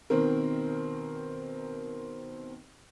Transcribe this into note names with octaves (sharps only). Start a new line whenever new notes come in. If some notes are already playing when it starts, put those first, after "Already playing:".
B2 D#3 C4 A#4